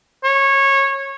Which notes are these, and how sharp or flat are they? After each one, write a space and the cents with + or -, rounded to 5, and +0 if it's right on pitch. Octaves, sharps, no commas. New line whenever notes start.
C#5 -20